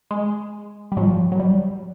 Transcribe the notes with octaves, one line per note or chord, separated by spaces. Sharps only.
G#3
G3
G#2 F3 F#3
F#3
G3